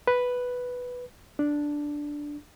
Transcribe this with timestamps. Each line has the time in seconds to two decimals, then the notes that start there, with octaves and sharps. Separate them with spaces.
0.07 B4
1.39 D4